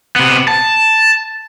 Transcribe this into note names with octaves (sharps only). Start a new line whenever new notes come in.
C3 B3
A5